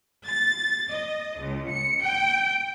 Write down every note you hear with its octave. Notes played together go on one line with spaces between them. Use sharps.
A6
D#5
C#2
C#7
G5